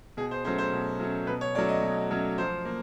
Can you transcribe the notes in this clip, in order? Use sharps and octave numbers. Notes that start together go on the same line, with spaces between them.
B2 G#4
C5
F#3 A3 C#4 C5
C5
B2
F#3 A3 C#4
B2 B4
C#5
F#3 A3 C#4 D5
D#5
B2
F#3 A3 C#4
F3 C5
A#3